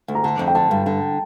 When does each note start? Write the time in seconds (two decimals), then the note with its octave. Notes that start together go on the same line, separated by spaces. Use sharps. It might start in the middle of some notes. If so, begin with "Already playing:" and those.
0.08 D2
0.15 A#5
0.24 D3 A5
0.39 F2
0.47 G5
0.55 D3 A5
0.71 G2
0.86 D3